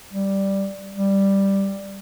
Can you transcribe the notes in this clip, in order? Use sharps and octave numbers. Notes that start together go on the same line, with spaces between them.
G3
G3